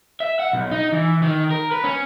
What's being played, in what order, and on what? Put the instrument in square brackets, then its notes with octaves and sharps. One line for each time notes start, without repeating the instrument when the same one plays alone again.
[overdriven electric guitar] E5
F#5
B1
D#4
E3
D#3
A#4
B4
C#4